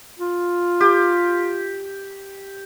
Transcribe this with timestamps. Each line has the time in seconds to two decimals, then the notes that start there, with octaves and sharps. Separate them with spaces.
0.19 F4
0.80 G4